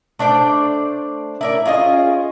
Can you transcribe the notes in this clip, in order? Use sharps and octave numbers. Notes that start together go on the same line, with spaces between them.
A3 D4 C5 D5
E4 A#4 D5
C#4 F4 G#4 D#5